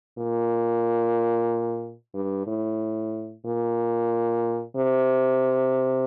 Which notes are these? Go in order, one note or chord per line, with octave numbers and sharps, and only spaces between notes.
A#2
G2
A2
A#2
C3